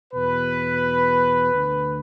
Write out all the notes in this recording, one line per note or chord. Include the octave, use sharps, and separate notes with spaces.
E2 B2 B4
D2 D3